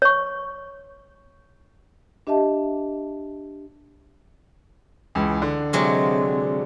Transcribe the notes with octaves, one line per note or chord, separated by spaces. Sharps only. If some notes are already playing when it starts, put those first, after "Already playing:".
C#5 C#6
D4 G4 D#5 E5 A5
C#2 E3
D3
C3 F#3 G#3